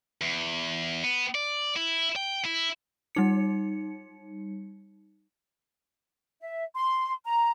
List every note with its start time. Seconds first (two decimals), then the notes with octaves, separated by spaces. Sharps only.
0.21 E2
1.04 B3
1.35 D5
1.76 E4
2.16 G5
2.45 E4
3.15 G3 D#4 C#7
6.41 E5
6.75 C6
7.26 A#5